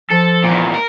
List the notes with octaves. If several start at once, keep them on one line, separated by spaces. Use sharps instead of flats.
F3 A4
E2 A#2
A#4